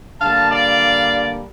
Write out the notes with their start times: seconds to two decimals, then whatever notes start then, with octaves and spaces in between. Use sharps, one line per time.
0.21 D3 G3 A#3 F5 A5
0.51 D5 F5